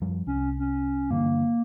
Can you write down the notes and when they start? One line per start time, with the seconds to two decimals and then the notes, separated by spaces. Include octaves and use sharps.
0.01 F#2 F3 G3
0.27 C2 C#4
0.59 C#4
1.11 G2 D3 E3 A#3